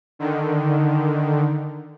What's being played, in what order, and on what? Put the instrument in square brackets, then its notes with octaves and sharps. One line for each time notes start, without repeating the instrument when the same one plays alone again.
[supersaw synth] D3 D#3